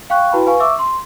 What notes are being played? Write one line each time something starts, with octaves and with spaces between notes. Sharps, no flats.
F5 G5 C#6 F#6
E4 F#4 B4 G5 A5 B5
B4 F5 G#5 C#6
E5 C#6 D6 E6
C6